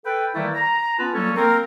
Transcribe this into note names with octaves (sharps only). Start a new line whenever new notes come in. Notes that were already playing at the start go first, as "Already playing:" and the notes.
A4 B4 G5
D#3 E3 G3 A3 A#3 E4
A#5
B3 C#4 F4 B4 A5
F#3 G3 A#3 C#4 A4
A#3 C4 A#4